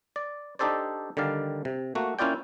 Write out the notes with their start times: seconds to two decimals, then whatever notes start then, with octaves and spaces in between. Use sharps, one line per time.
0.16 D5
0.59 D4 D#4 G4 A4 C5 D5
1.17 D3 D#3 G3 D5 F5
1.65 C3
1.95 A3 A#3 F#4
2.19 A#3 C#4 E4 F4 D5 G5